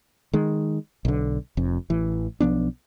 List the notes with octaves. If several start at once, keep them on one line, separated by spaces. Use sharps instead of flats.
D#3 G#3
B1 D3
F1 F2
A1 E3
B1 F3 B3 D4